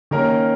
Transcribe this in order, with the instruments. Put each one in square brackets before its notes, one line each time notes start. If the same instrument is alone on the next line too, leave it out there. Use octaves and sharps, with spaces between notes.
[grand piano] D#3 A#3 C#4 A#4